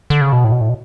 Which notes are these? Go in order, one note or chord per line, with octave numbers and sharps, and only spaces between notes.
D3
C#3
B2
A2
B2
A2
B2